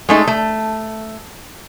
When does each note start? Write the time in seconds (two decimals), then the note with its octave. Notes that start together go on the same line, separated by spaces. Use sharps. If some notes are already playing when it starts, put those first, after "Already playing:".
0.09 G#3 A3 D#4
0.27 A3